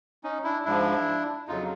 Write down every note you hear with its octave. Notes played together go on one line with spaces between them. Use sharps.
C#4 D#4
D4 E4
G#2 F3 D4 E4
F2 C#3 F#3 D#4 F4